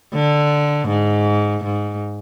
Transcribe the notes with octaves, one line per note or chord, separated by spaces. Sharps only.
D3
G#2
G#2